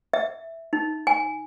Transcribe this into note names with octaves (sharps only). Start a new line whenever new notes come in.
E5
D#4
G#5